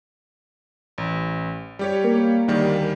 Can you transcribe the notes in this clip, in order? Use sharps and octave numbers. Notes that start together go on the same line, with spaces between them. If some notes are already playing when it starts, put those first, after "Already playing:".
A1
G3 G4 C#5
A#3
D2 D#3 G3